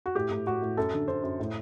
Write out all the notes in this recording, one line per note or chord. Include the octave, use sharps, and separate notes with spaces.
F#4
A2 G4
A2
A2 F#4
A2
F#2 A4
D3
D3 C5
F#2
A2